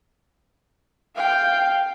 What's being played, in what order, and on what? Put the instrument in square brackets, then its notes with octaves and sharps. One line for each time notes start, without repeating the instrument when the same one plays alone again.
[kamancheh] F5 G5